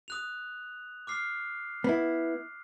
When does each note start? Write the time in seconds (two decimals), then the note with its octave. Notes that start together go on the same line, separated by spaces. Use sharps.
0.08 D#6 F#6 F7
1.07 D6 F6 C7
1.84 B3 E4